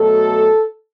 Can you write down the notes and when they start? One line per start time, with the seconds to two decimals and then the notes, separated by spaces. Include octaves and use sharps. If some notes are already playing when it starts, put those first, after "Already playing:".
Already playing: B2 F#3 A3 A4